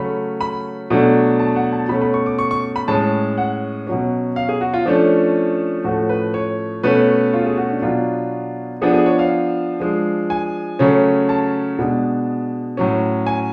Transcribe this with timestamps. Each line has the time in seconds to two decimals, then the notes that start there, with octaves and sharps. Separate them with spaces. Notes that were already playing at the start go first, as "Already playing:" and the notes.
Already playing: C#3 F#3 A3 C#4 B5
0.41 B5
0.90 B2 F#3 A3 D4
1.39 A5
1.56 F#5
1.73 A5
1.89 B2 A3 C#4 B5
2.02 B5
2.14 C#6
2.26 D6
2.39 C#6
2.51 C#6
2.76 B5
2.88 A2 G#3 C#4 A5
3.38 F#5
3.87 B2 F#3 C#4
4.36 F5
4.49 G#4
4.61 F#4
4.74 F4
4.86 F3 A3 C#4 D4
5.84 A2 F3 A3 C#4 F#4
6.09 B4
6.34 C#5
6.83 B2 A3 C#4 B4
7.33 F4
7.45 G#4
7.58 F#4
7.70 D4
7.82 B2 F#3 B3 D4 F4
8.81 F3 B3 D4 G#4
8.94 G#4
9.06 C#5
9.19 F5
9.80 F3 G#3 D4
10.30 G#5
10.79 C#3 F#3 A3 C#4
11.29 A5
11.79 B2 G#3 B3 D4
12.77 A2 F#3 C#4
13.27 G#5